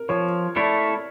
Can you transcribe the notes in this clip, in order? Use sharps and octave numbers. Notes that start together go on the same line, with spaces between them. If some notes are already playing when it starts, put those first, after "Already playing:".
Already playing: A#4
F3 C#5
A3 E4 A4 C#5 D5